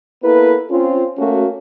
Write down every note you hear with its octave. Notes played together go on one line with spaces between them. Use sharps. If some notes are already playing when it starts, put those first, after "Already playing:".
A#3 B3 E4 A4 B4
C4 C#4 F4
A3 A#3 C#4 F#4